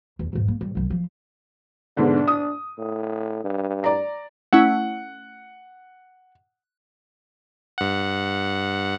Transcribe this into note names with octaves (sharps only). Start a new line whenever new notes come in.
E2 D4
E2 G#2
A#3
G2
C2 F#3
F3
G#2 B2 D3 D4
D#6
A2
G2
D5 A#5
A3 C#4 E4 F#5
G2 F#5